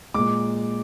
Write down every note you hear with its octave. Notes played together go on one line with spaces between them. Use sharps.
A#2 G#3 D6